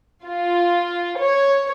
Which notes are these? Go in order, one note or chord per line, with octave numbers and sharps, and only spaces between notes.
F4
C#5